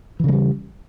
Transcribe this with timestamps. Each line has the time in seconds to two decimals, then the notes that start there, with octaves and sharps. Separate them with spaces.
0.20 E3
0.24 C#3
0.28 G#3
0.33 G3